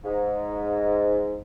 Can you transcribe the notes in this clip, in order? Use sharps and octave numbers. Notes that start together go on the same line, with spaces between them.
G#2